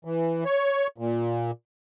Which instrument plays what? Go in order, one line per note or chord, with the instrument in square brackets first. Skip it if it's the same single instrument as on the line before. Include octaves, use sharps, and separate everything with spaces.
[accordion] E3
C#5
A#2